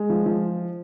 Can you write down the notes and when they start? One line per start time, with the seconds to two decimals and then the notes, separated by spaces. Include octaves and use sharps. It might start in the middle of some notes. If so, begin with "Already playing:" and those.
Already playing: G#3
0.10 F3
0.26 F3